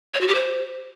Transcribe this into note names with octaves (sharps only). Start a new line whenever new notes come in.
C#5
F#4
G4
C5